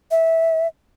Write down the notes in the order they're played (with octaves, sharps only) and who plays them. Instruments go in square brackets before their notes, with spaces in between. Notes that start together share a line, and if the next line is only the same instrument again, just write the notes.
[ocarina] E5